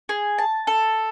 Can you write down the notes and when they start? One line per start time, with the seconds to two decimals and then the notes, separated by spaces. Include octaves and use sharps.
0.09 G#4
0.38 A5
0.67 A4